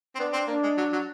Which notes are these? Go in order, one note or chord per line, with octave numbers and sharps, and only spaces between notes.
C4
B3 D4
C4
A#3 D4
G#3
F#3
F#3